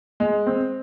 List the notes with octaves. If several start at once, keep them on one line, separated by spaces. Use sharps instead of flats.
G#3
C4